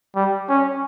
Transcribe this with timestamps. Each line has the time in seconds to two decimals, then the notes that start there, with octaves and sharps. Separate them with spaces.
0.16 G3
0.49 C#4